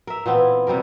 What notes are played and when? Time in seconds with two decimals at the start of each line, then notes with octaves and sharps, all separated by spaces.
0.07 A#4 E5
0.26 A#2 E3 B3 C4
0.67 C3 G3 G4 A#4